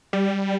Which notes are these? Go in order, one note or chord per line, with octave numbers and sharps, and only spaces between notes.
G3